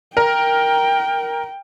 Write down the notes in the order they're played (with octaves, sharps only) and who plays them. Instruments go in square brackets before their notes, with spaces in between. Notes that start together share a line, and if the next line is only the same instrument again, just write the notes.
[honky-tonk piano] A#4 [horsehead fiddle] G5